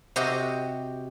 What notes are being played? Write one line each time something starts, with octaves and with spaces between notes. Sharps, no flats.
C3 F#4 G4 D#5